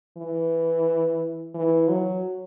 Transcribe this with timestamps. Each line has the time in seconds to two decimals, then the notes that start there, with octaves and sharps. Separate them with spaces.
0.18 E3
1.55 E3
1.88 F#3